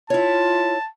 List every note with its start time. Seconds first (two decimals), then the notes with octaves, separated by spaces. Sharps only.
0.10 E4 F4 C#5 A5